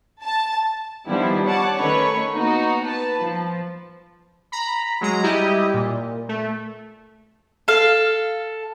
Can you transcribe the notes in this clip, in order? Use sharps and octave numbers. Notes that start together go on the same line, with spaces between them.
A5
D#3 F3 G3 B3 D4 E4
C#5 F#5 A5 D6
D#3 A3 C#4 B4 C#5
A#3 B3 D#4 F#4
B4 A5
F3
A#5 B5
F#3 G#3 A#5
G3 E4 G4 D#5
A#2
A3
A4 F5